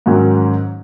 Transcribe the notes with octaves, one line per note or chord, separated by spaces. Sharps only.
G#2 D#3 F#3 C#4 F#4